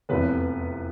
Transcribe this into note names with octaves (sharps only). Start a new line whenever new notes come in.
F1 E2 C3 B3 B4